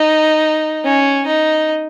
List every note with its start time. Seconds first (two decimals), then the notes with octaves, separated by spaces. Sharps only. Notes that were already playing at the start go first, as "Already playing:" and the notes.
Already playing: D#4
0.84 C#4
1.26 D#4